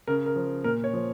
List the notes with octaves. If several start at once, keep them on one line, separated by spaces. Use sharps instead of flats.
C#3 A#4
A#4
F3
A#2 A#4
C#5
F3